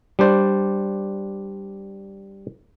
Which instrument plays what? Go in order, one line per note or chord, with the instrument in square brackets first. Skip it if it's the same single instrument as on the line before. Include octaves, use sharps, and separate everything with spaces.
[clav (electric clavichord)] G3 D4 C5 D5